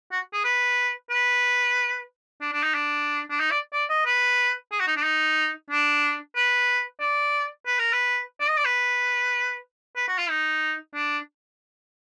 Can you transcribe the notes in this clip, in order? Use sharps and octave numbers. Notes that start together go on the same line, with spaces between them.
F#4
G#4
B4
B4
D4
D4
D#4
D4
D4
D#4
D5
D5
D#5
B4
G#4
F#4
D#4
D4
D#4
D4
B4
D5
B4
A#4
B4
D5
D#5
D5
B4
B4
F#4
F4
D#4
D4